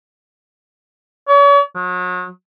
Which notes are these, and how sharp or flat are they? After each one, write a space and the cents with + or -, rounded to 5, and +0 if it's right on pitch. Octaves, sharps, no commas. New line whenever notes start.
C#5 +40
F#3 -35